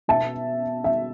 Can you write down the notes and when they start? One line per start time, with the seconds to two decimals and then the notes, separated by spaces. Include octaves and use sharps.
0.08 B2 B3 E5 A5
0.84 E5